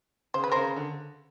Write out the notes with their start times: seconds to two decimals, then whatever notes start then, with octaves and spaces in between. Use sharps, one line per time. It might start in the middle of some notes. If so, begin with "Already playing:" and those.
0.34 C#3 C5
0.44 B4
0.52 C#3 A#4 C5
0.76 D3